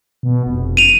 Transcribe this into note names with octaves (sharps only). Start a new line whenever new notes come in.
B2
F1
D#7 F7